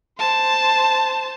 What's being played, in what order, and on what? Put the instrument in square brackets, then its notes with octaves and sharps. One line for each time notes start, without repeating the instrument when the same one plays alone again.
[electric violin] C5 A5